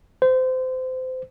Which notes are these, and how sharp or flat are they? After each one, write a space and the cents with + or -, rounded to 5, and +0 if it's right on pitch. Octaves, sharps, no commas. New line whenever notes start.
C5 -25